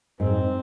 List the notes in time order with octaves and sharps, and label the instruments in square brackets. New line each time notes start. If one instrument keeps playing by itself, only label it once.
[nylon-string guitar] G#2 [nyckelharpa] C4